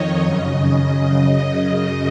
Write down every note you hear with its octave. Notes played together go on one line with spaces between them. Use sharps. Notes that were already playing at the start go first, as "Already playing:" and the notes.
Already playing: F2 D#3 C#5 D#5
F#2 C#3 D#5
F#2 C#3 D#5
D#5